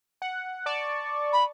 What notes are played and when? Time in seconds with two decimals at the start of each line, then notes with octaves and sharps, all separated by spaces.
0.22 F#5
0.66 D5 A5 C#6
1.32 B5